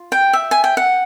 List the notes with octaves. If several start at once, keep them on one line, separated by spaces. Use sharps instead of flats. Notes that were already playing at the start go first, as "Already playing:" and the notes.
Already playing: F4
G5
E5
G#5
G5
F#5